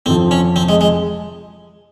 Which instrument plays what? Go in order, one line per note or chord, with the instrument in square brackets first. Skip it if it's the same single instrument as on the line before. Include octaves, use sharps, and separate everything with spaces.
[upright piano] F2 C3 F3 [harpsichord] C4
[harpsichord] C#4
C4
G#3
G#3